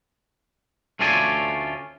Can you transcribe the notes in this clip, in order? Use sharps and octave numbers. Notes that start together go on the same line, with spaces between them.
D2 A3 C#4 F4 D5 G#5